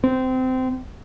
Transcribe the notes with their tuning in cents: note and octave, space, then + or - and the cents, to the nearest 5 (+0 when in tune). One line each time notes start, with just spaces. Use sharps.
C4 -20